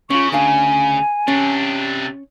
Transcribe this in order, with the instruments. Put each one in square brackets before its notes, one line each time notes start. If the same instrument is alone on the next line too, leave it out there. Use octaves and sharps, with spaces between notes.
[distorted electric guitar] C#3 [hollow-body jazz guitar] C#4 F4 [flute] C#6
[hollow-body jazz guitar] D2 D4 F5 [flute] G#5
[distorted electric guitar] C3 D4 [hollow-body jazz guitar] C#4